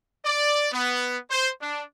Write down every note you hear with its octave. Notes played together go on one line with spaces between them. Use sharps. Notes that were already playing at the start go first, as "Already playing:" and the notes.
D5
B3
C5
D4